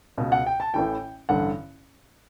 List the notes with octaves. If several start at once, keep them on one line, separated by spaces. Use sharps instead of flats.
C#2 B2
F#5
G5
A5
A1 A2 E3 G5
A1 G2 D3 F#5